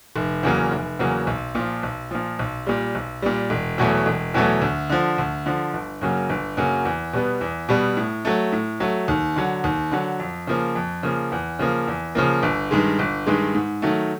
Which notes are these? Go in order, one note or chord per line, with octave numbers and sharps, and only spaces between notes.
F1
E2 C#3 F#3 A#3
F1
E2 C#3 F#3 A#3
B1
A#2 F3
B1
A#2 F3
B1
A#2 G3
B1
A#2 G3
E1
E2 B2 F#3 A3
E1
E2 B2 F#3 A3
D2
D3 F3
D2
D3 F3
G1
F#2 C#3 F#3 A#3
G1
F#2 C#3 F#3 A#3
E2
B2 G3 B3
E2
B2 G3 B3
A2
F#3 A3
A2
F#3 A3
D#2
D3 F#3
D#2
D3 F#3
F2
C#3 F3 A#3
F2
C#3 F3 A#3
E2
C#3 F3 A#3
E2
C#3 F3 A#3
G1
G2 D#3 G#3
G1
G2 D#3 G#3
G#2
D#3 F#3 A3